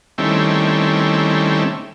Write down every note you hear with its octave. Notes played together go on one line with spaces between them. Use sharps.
D#3 G3 A3 C4 C#4 E4